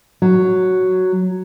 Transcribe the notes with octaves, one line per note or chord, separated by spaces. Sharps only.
F#3